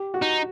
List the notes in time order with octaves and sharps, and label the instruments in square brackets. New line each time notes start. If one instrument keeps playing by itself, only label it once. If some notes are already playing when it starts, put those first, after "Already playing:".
Already playing: [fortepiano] G4
F#4
[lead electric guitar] D#4